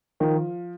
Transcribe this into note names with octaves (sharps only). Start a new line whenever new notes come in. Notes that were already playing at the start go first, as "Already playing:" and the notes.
D#3 F3